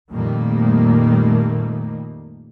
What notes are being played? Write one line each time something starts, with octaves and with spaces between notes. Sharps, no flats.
F2 A#2 D#3 G3 A3 A#3